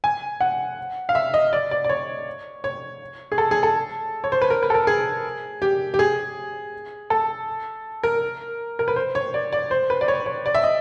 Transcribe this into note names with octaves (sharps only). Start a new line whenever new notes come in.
G#5
F#5
F5
E5
D#5
D5
D5
D5
C#5
C#5
G#4
A4
G#4
A4
C#5
C5
B4
A#4
B4
A4
A#4
G#4
G4
G4
G#4
A4
A#4
A#4
B4
C5
C#5
D5
D5
C5
B4
D5
C#5
C#5
D5
E5
D#5